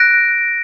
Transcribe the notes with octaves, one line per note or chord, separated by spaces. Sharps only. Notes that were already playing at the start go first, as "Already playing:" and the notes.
Already playing: F#6 A#6 D7